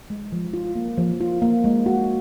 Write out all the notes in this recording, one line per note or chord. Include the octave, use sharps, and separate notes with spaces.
G#3
F3
F4
A#3
F3
F4
A#3
G#3
F#4